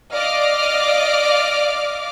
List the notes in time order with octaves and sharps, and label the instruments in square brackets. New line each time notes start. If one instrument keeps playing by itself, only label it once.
[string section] D5 D#5 F5 D6 F6